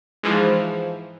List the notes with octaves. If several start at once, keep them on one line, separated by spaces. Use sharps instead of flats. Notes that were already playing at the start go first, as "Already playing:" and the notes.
G#2 E3 F3